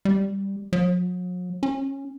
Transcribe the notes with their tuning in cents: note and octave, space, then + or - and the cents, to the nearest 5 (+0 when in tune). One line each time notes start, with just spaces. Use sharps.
G3 +5
F#3 -45
C#4 -15